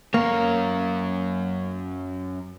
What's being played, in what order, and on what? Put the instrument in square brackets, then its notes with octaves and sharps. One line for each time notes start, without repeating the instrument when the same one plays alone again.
[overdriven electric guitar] F#2 C#5 [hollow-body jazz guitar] A#3